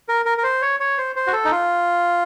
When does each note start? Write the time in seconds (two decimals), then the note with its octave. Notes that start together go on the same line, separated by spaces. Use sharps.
0.09 A#4
0.25 A#4
0.38 A#4
0.43 C5
0.62 C#5
0.80 C#5
0.98 C5
1.16 C5
1.27 F#4
1.33 A4
1.45 D#4
1.51 F4